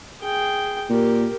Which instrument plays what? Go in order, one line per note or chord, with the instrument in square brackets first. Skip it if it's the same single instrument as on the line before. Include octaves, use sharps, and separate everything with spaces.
[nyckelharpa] G#4 G5
[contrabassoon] A#2 [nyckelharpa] G4 A#4